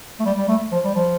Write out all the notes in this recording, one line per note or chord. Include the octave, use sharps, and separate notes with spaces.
A3
G3
G3
A3
F3
G3
F3